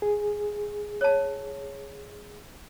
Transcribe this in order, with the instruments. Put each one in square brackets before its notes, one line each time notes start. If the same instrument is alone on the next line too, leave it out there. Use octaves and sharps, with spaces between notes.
[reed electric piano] G#4
[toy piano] C#5 A5